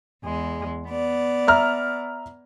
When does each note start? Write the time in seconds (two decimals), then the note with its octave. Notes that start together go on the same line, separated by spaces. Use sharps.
0.23 E2 G#3
0.88 B3 D5
1.47 E5 A#5 F6